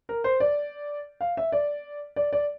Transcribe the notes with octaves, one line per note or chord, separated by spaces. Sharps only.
A#4
C5
D5
F5
E5
D5
D5
D5